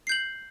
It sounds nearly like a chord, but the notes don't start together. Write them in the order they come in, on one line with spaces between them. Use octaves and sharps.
C7 G6 F#7